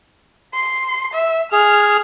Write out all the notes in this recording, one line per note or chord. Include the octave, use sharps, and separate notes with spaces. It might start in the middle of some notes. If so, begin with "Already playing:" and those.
C6
E5
G#4 F6